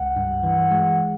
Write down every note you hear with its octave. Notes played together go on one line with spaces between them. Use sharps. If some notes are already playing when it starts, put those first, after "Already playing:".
Already playing: C#2 F#5
G2
E3
G#3